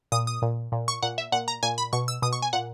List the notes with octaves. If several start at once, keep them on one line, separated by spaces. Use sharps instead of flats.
A#2 D#6
D#6
A#2
A#2
C#6
A#2 F#5
E5
A#2 F#5
A#5
A#2 G#5
B5
B2 C#6
E6
B2 D#6
C#6
G#5
A#2 F#5